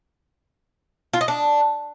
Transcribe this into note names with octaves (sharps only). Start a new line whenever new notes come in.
F4
D#5
D4